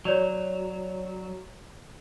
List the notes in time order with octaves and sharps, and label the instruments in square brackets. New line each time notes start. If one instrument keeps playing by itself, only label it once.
[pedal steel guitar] F#3 [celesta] C#5 D5 F7